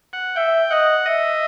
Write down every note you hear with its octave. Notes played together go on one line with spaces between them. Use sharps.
F#5
E5 G5
D#5 F#5
D#5 E5